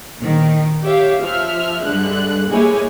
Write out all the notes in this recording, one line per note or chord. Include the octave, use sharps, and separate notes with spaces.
A#1 D#3
G4 C#5 E5 F5
F3 E5 F6
G2 D3 G#3 F#6
G#3 A#3 E4 G4 C#5 G#5